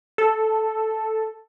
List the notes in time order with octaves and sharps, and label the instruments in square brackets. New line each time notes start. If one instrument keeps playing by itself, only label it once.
[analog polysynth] A4